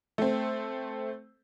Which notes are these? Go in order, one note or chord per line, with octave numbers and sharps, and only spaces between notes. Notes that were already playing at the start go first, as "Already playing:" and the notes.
A3 C4